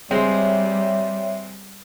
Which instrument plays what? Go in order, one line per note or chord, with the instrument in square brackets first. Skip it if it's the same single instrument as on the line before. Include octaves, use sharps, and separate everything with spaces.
[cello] G3 [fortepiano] G#3 C4 [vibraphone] C#5 E5 G5